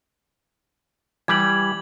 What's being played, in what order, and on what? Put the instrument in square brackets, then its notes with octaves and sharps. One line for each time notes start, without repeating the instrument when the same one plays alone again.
[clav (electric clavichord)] E3 G3 G4 [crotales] G#6 F#7